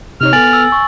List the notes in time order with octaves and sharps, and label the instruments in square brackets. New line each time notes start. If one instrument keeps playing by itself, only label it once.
[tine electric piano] C3 D#4 C#5 [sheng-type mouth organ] F6
[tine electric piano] B3 A4 [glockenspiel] G#5 A6 F#7
[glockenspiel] E6
C#6